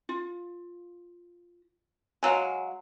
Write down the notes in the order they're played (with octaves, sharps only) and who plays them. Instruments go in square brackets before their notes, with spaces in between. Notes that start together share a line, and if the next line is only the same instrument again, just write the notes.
[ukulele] F4
[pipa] F#3 G#3 [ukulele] F5 G#5